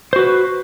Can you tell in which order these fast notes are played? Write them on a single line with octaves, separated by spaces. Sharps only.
C5 F#4 B4